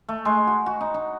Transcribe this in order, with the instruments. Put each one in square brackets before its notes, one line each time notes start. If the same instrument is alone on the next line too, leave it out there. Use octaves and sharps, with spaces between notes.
[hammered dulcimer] A3
G#3
F#4
F#4
D#4
D#4